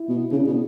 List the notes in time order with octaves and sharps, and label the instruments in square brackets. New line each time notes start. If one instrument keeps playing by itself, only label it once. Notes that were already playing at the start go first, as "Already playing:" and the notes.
Already playing: [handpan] E4
[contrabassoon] B2
[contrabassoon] C#3 [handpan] D4
[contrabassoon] B2